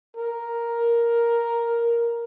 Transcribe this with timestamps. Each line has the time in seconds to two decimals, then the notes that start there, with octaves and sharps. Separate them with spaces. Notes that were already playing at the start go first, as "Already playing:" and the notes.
0.16 A#4